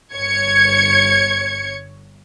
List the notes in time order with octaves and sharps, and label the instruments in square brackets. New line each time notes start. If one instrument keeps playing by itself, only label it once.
[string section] G1 C#5 G#6 C#7